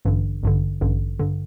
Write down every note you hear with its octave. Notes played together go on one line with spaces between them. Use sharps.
A1 G2 D3
A1 G2 D3
A1 G2 D3
G2 D3